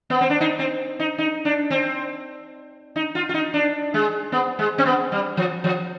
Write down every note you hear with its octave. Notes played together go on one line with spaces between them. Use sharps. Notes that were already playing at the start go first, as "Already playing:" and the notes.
B3
C4
D4
D#4
C4
D#4
D#4
D4
C4
D#4
F4
F4
D#4
D4
G#3
B3
G#3
C4
B3
G3
F3
F3